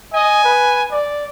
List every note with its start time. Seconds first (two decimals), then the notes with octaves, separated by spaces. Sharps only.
0.14 D#5 G#5
0.44 B4
0.92 D5